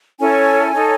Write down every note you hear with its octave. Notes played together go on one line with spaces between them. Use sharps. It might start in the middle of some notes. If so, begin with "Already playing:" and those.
C#4 E4 A4 C#5 G#5
D#4 A4 C#5